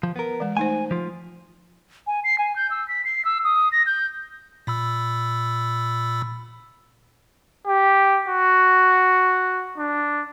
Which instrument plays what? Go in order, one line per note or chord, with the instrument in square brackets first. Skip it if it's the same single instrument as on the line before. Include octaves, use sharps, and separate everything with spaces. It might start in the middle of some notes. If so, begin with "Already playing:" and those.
[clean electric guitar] F3
B3 A#4
[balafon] E3 G#3
[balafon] A3 D#4 C5 [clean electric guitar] G#5
[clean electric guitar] F3 F4
[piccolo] G#5
C7
G#5
G6
E6
B6
C7
E6
D#6
A#6
G6
[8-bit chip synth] A#2 B5 E6
[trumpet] G4
F#4
D4